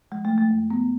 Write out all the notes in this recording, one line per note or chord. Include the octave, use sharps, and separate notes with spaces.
F3 G#3
A3
F3
A3
F#2
F3 B3